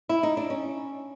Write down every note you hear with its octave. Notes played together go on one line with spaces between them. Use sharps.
E4
D#4
D4
C#4